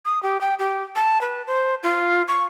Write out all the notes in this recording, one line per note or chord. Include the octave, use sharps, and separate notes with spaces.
D#6
G4
G5
G4
A5
B4
C5
F4
C#6